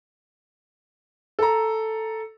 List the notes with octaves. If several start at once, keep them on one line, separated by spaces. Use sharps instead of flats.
A4 A#5